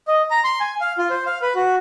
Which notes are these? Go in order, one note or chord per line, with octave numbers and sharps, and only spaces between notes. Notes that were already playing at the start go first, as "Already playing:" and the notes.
D#5
A#5
C6
G#5
F5
F4
C5
F5
B4
F#4